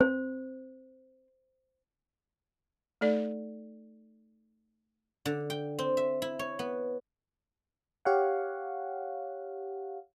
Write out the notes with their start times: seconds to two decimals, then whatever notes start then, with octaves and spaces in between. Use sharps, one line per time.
0.01 C4 C5
3.01 A3 D#4 A4 D5
5.25 D3
5.50 G5
5.79 C4
5.97 E5
6.22 E4
6.39 C#5
6.59 B3
8.05 G4 C#5 F5 F#5